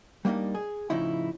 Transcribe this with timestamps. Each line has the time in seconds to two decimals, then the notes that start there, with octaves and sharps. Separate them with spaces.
0.25 G3 A#3 B3 D4 D#4
0.55 G#4
0.90 A2 C#3 F3 D#4 E4